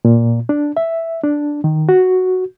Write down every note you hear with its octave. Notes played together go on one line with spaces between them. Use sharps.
A#2
D4
E5
D4
D#3
F#4